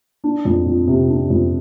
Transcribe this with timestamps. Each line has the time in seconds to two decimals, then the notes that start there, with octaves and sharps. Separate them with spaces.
0.24 D4
0.45 F2
0.66 F3
0.88 C3
1.09 D4
1.30 F2